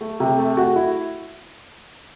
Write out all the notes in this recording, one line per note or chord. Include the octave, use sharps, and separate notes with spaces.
A3
C3
A3
F#4
E4